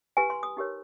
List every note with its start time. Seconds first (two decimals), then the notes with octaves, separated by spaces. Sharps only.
0.17 E4 G4 B4 G#5
0.30 C6
0.43 D#6
0.57 D#4 G4 A#4 C#5